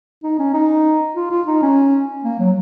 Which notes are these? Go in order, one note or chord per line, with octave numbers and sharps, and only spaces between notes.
D#4
C#4
D#4
F4
F4
D#4
C#4
A#3
F#3